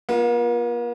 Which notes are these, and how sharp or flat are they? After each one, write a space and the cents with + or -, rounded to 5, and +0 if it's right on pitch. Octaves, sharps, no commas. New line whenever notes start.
A#3 +45 F4 +0